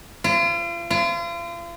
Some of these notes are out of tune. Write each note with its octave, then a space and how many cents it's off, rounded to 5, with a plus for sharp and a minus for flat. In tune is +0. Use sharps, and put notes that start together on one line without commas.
F4 -40
F4 -40